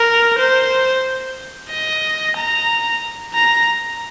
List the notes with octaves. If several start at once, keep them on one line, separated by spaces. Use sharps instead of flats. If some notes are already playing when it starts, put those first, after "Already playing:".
Already playing: A#4
C5
D#5
A#5
A#5